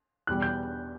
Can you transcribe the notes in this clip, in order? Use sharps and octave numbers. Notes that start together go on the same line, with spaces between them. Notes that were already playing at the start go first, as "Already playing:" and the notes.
E2 B2 G3 F#6
G6